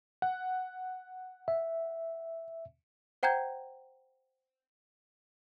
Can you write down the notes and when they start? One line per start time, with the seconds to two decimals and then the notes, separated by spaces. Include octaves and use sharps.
0.22 F#5
1.48 E5
3.23 C5 F#5 G5 A#5 G6 G#6